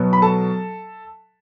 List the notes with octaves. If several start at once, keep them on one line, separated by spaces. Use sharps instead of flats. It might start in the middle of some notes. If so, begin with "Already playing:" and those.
Already playing: B2 F#3 B3
B5
A4 A5